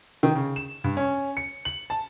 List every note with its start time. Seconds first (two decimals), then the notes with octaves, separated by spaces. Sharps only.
0.23 D#3
0.35 C#3
0.56 E7
0.84 G2
0.97 C#4
1.37 C#7
1.65 F#7
1.90 A5